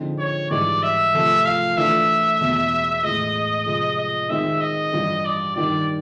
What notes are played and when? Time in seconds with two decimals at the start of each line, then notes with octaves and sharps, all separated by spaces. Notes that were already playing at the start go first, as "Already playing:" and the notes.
Already playing: D3 F3 G#3 C4 D#4
0.19 C#5
0.50 G#2 E3 G3 D5
0.83 E5
1.14 C3 F3 A3
1.45 F5
1.77 E3 A3 D4 F4 E5
2.40 E2 B2 G#3
3.03 A2 E3 G#3 D#5
3.66 C3 F3 G#3 C4
3.98 D#5
4.29 D#3 G#3 C4 D#4 E5
4.61 D#5
4.93 G2 E3 G3
5.25 D5
5.56 G2 D#3 G3 D5